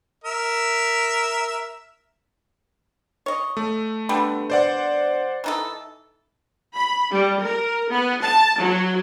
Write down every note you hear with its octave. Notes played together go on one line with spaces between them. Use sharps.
A#4 E5
C#5 D#5
A3
D3 G3 B3
C5 D5 F#5
E3 D#4 A4
B5
G3
A#4
B3
A5
F#3